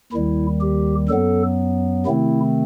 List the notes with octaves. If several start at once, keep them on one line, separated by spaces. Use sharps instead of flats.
D#2 D#3 G3 E4
G4
F#2 F#3 B3 A4
C3 D#3 A3 C4 E4